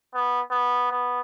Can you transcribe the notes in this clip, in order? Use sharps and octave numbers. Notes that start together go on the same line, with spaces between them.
B3
B3
B3